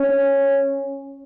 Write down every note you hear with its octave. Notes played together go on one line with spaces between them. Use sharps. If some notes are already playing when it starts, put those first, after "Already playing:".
Already playing: C#4